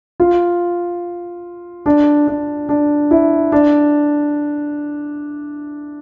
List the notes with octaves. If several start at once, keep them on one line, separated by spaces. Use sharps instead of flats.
F4
D4
D4
D4
E4
D4